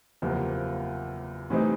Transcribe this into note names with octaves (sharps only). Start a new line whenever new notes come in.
F#1 E2 C3 F3 A#3
A2 E3 G3 C4 D#4